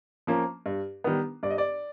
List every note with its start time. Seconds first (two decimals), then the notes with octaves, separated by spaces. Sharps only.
0.27 F3 A#3 C#4
0.66 G2
1.04 D#3 G3 B3
1.43 G2 D5
1.50 D#5
1.58 D5